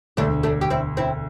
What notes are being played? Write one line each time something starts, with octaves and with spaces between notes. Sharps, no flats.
E1 D2 D3 A3 D4
A3 D4
G4
C4 E4
C4 E4